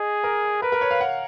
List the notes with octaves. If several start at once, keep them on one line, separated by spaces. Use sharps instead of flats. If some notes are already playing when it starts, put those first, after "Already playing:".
Already playing: G#4 D#5
A#4
A#4 B4
A#4
C#5
F5
F#5